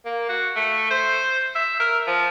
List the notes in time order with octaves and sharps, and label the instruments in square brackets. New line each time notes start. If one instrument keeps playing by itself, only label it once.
[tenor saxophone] A#3
F#4
A3
C5
E5
A#4
F3